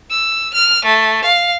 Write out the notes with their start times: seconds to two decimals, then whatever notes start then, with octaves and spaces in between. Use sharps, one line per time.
0.10 E6
0.54 F6
0.85 A3
1.24 F5